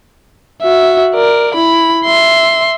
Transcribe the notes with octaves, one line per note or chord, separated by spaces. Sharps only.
F#4 E5
A#4 D5
E4 B5
E5 C6